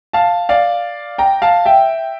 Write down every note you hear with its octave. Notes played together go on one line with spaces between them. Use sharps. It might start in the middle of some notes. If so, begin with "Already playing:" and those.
F5 A5
D5 F5
G5 A#5
F5 A5
E5 G5